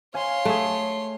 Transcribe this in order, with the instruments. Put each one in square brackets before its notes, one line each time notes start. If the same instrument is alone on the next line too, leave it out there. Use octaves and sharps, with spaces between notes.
[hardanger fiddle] C#5 C6 [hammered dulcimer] F5 G#5
[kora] A3 G#4